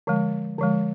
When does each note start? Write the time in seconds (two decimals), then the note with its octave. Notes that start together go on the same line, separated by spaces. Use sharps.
0.07 D3 F3 G#3
0.58 D3 F3 G#3